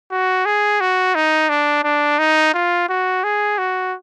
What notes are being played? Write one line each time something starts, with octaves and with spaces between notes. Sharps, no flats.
F#4
G#4
F#4
D#4
D4
D4
D#4
F4
F#4
G#4
F#4